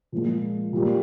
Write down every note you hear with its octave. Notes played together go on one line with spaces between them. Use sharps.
A#2 F3 G#3
A#2 G3